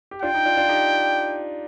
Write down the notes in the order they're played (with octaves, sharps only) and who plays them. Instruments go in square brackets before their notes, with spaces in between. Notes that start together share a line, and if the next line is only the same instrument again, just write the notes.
[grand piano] G4
[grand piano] D4 F4 [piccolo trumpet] G5
[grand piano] D#4
D4 F4
D4 F4
D#4 G4